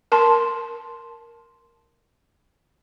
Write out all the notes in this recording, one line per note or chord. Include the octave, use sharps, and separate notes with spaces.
A#4 A5 C6